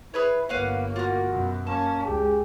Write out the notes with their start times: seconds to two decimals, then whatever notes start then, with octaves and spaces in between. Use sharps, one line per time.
0.14 E4 G#4 B4 C#5
0.49 G1 A#3 B4 C#5 F5 F#5
0.96 F4 F#4 A#4
1.28 F#2 B2
1.67 A#3 C#4 A5
2.05 C#2 G4 G#4